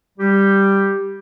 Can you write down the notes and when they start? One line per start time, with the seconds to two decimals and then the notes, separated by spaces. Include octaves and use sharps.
0.19 G3 G4